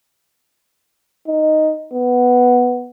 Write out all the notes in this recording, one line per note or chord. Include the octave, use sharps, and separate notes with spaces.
D#4
B3